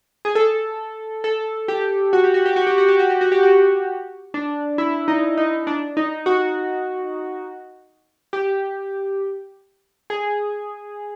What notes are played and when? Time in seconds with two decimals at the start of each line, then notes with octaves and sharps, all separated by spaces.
0.25 G#4
0.35 A4
1.24 A4
1.68 G4
2.13 F#4
2.24 G4
2.34 F#4
2.46 G4
2.56 F#4
2.67 G4
2.78 F#4
2.88 G4
2.99 F#4
3.10 G4
3.21 F#4
3.32 G4
3.43 F#4
4.34 D4
4.78 E4
5.08 D#4
5.38 D#4
5.67 D4
5.97 D#4
6.26 F#4
8.33 G4
10.10 G#4